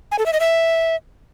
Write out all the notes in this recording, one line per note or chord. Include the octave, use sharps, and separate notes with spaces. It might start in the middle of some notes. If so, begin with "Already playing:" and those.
G#5
A4
E5
D#5
E5